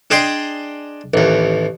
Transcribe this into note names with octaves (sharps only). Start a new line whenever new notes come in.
D4 G#4 D5 D#5 G5 C6
A1 D#2